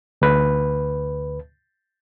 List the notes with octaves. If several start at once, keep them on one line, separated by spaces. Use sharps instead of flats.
D2 B4